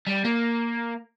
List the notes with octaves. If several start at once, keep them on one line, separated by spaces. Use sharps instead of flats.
G3
A#3